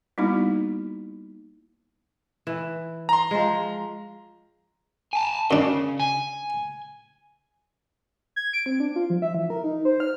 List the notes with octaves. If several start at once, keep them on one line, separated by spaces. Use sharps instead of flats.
G3 A#3 B3 D#4 E4 F#4
E3
A#5 C6
F3 G#3
G#5 A5
F#2 C#3 D4
G#5
G#6
D7
C4
D4
F4
F3
E5
E3
A#4
D#4
C5
F6